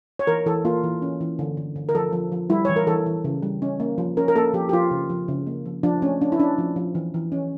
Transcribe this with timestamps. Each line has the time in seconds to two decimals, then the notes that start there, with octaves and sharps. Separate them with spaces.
0.19 C#5
0.27 E3 A#4
0.46 E3 A4
0.65 A#3 F4
0.83 E3
1.02 C#4
1.21 E3
1.39 D3
1.57 D3
1.76 D3
1.89 A#4
1.95 F3 A4
2.13 F3
2.32 F3
2.50 G3 E4
2.65 E3 C#5
2.76 A#4
2.87 E3 A4
3.06 E3
3.24 C#3
3.43 G3
3.62 C#4
3.80 A#3
3.98 F3
4.17 C#4 A#4
4.28 A#4
4.36 A#3 A4
4.53 F3 G4
4.69 G4
4.73 F3 F4
4.91 C#3
5.10 F3
5.28 C#3
5.47 A#3
5.65 F3
5.83 F3 D4
6.02 A3 C#4
6.21 C#4 D4
6.32 E4
6.40 C#4 D4
6.58 F3
6.76 F3
6.95 E3
7.14 E3
7.32 C#4